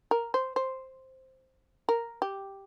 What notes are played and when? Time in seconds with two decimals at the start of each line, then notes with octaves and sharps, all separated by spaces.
0.11 A#4
0.34 C5
0.56 C5
1.89 A#4
2.22 G4